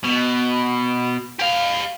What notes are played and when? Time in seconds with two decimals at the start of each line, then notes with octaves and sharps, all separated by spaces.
0.04 B2
1.40 G4 F5